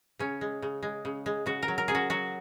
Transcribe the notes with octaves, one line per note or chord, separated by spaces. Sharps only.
C#3 C#4
G#3
C#3
G#3
C#3
G#3
C#3 F#4
A#4
F#3
A#4
C#3 G#4
F#4
F#3 F#4